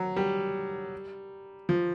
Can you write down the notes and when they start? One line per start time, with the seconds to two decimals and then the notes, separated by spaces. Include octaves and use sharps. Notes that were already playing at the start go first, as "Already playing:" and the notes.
Already playing: F#3
0.17 G3
1.69 F3